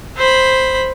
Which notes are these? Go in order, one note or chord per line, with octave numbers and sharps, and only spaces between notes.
C5 B5